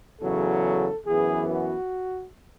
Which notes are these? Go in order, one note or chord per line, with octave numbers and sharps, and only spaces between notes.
E2 C#3 F#3 A4
F#2 E3 B3 G#4
F#4